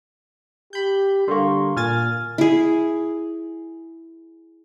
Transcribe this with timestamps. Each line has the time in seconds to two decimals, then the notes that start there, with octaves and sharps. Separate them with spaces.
0.73 G4 B5 G6
1.28 D3 G3 A#3 C6 C#6
1.77 A#2 A#3 G#5 F6 A6
2.38 E4 G#4